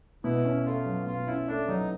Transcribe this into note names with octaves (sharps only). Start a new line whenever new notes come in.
B2 E4
C#4
A3 F4
F#3
B2 F4
C#4 E4
A3 D4
F#3 D#4